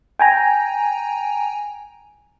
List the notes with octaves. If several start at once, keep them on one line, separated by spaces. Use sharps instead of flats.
G5 G#5 A#5